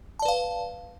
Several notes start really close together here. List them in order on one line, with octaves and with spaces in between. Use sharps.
A5 D5 B4 F5